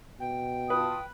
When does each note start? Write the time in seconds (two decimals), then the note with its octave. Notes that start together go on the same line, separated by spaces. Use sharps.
0.20 B2 G5
0.70 F4 B4 A5 D#6